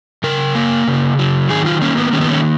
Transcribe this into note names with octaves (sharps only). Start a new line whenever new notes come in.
C#3 A#4
A#3
C#3
F#3
D#3 G#4
F4
A#3 C#4
B3
D#3 C#4
B3
C#4